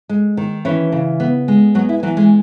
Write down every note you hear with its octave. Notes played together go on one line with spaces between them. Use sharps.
G#3
D#3
E3 C#4 C#5
C#3
B3
G#3
F#3 B3 F#4
E4
E3 F#3 F#4
G#3 G#4